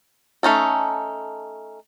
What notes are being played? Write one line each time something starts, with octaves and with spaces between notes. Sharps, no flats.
A3 C#4 D#4 A4